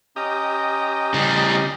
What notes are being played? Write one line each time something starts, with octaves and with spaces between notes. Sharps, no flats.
C#4 G4 D#5 A#5 D#6
C#3 G3